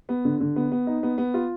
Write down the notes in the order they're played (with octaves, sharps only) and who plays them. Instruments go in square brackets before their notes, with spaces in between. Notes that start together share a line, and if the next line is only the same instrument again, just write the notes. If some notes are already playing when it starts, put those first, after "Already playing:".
[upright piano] B3
D3
D3
B3
B3
D#4
B3
B3
F4